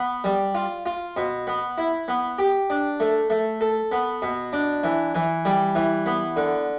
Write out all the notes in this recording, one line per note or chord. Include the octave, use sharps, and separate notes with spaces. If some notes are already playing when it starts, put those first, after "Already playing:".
Already playing: B3
G3
F4
F4
B2
B3
E4
B3
G4
D4
A3
A3
A4
B3
B2
D4
E3
E3
G3
E3
B3
D3